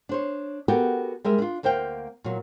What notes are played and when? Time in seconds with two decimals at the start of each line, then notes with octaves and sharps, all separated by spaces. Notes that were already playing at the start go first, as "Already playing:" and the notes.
0.09 D4 C5 C#5
0.68 B3 F#4 G4 A4 A#4
1.25 G3 G#3 A#4 E5
1.38 D4 F4
1.63 D2 A#3 C5 F5 G5
2.24 A#2 F#3